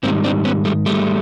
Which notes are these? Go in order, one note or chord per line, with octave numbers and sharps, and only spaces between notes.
G#2 D#3 G3 A#3 C4
C4 D4
B3 C#4
G3 A3
G3 A3